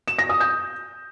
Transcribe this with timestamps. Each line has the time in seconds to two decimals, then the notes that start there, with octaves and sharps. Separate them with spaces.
0.08 E7
0.19 A#6
0.29 D#6
0.40 G6